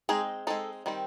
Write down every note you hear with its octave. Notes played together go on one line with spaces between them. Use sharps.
G#3 C4 D#4 G#4
G#3 C4 D#4 A4
D#3 G3 C4